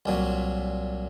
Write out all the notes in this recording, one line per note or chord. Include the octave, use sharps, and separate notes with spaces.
C2 A#2 F#3